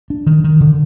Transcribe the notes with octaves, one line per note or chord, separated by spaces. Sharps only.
D4
D#3
D#3
D3